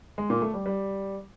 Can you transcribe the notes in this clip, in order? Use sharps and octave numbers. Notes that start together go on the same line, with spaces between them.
G#3
A#2
A3
G3
G3